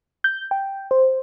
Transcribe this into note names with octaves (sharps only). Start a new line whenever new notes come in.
G6
G5
C5